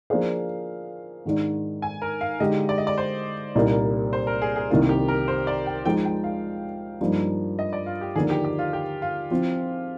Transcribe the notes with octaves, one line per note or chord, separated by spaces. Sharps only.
F3 A#3 D4 G#4 C5 F5
G#2 D#3 G#3 D4
G#5
A#4
F5
D3 G#3 D#4 G4 D#5
D5
D#5
D5
C5
C2 A#2 G3 A#3 D#4
C5
A#4
G#4
G#4
C2 C3 D#3 A#3 D#4 F4
G4
A#4
C5
D5
G5
F3 G#3 D#4 G5
G5
F5
G2 F3 A#3 D#4
D#5
D5
F4
G4
D#2 D3 F3 A#3 D4 G#4
G4
G4
F4
G4
F4
F3 C4 F4